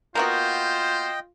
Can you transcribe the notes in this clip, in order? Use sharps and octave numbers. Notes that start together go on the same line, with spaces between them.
A#3 B3 F4 F#4 C5 D#5 G5